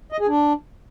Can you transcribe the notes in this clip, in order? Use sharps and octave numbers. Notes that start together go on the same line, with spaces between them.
D#5
G#4
D4